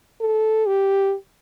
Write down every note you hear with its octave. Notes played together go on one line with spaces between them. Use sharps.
A4
G4